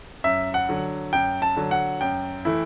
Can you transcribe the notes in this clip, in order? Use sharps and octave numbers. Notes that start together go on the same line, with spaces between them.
F#2 E5
F#5
D3 F#3
F#2 G5
A5
D3 F#3
F#5
F#2 G5
E3 A3 E4